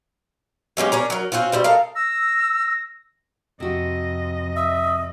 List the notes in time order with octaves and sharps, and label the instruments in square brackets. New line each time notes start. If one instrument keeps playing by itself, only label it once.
[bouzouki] F#3 G#3 C#4 G4
C#4 D4 A#4
F#3 A#4
C4 C#4 F4 F#4
B2 G3 C4
A4 A#4 D#5 F5
[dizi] E6 [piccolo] A#6
[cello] F2 D#5 [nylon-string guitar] C3 F#4
[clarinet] E5 [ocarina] D#6